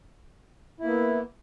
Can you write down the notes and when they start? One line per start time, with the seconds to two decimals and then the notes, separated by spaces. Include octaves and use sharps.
0.80 E4
0.83 A#3
0.86 B3